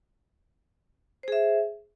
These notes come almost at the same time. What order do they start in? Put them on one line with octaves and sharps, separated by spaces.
C5 G#4 E5